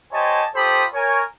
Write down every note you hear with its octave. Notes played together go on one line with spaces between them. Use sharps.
G4 C5 C#5 D#5 G#5 A5
F4 G4 A4 C5 B5 D#6
A#4 C#5 G#5